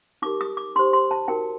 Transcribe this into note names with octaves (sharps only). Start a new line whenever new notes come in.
D#4 G4 A#4 D6
D#6
D6
D#4 G4 C5 C6
C6
A5
D#4 F#4 A#4 G5